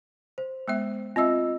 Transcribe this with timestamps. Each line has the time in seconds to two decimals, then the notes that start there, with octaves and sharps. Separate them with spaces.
0.38 C5
0.68 G#3 B3 E5
1.16 C4 F4 D#5 E5 E6